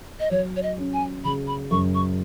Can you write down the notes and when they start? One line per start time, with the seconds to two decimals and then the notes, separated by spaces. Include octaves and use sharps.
0.20 D#5
0.31 F#3 C#5
0.56 C#5
0.63 D#5
0.78 C#4
0.93 G#5
1.24 C#3 B5
1.47 B5
1.71 F#2 C#6
1.95 C#6